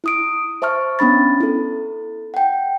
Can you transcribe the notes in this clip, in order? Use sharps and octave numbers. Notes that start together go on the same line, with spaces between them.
E4 D#6 D7
C5 E5 A5 C#6 F6
B3 C#4 D4 B5 A6
E4 A4
F#5 G5